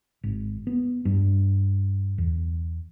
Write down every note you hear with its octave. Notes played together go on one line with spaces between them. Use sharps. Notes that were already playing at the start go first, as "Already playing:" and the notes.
G#1
B3
G2
E2